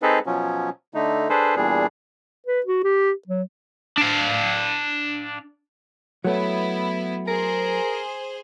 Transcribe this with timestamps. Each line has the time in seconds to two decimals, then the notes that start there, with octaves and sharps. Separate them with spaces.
0.02 C4 D#4 G#4 A4 B4
0.26 B2 F3 F#3 C#4
0.94 D3 A3 D#4
1.30 D4 G#4 A4 B4 C5
1.56 E2 A#2 G3 D4 G#4
2.46 B4
2.66 F#4
2.84 G4
3.27 F#3
3.98 D4 F5
6.24 F#3 A3 B3 E4
7.28 G#4 A#4 C5